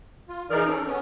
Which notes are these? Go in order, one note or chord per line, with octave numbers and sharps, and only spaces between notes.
F4
E3 D#4 G#4 A#4 D5 F6
C#4 A4
B3 C#4